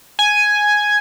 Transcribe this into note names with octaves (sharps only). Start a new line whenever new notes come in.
G#5